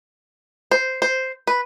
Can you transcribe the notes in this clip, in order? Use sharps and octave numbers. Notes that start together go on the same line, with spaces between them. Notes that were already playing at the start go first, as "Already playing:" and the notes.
C5
C5
B4